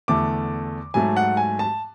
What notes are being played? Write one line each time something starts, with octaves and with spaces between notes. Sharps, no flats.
E2 D3 A3 D6
G#2 F#3 A3 G#5
F#5
G#5
A5